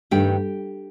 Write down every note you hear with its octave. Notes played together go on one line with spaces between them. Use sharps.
G2 D#3 A3 D4 G4 G5